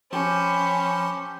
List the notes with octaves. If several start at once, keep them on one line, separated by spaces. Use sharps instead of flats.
F3 C#4 G4 A5 B5 C6